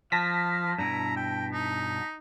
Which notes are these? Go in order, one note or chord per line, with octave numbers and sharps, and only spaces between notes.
F3 F5 A5 A#6 B6
G2 B2 E4 A#5
G5
D#4